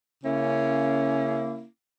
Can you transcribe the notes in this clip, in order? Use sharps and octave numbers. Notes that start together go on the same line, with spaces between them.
C#3 A#3 C#4 E4